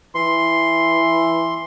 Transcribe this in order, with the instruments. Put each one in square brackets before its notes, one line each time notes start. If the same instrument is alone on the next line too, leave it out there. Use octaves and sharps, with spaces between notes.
[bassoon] E3 [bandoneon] C6